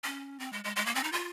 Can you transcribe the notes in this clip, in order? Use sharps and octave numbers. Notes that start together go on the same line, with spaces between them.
C#4
C4
G#3
G#3
G#3
A#3
C4
D#4
F4